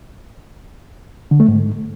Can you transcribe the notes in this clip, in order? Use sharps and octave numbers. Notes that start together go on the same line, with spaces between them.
D3
A3
G#2